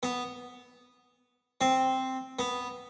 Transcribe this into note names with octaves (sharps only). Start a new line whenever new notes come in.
B3
C4
B3